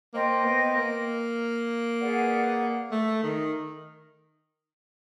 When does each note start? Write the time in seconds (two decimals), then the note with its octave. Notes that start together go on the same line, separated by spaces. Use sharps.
0.13 A#3 C5 D#5 G5
0.45 B3
0.75 A#3
1.99 G#4 B4 D5 F#5
2.91 A3
3.23 D#3